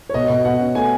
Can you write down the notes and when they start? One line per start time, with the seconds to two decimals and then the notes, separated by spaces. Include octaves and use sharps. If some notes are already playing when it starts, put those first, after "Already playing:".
0.09 C#5
0.14 B2 D#5
0.30 B2
0.45 B2 F#5
0.60 C#4
0.75 A3 G#5